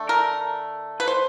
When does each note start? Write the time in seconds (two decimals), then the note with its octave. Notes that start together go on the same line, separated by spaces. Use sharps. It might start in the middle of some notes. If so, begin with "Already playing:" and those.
Already playing: D3 A3
0.09 A#4
1.00 B4
1.08 C5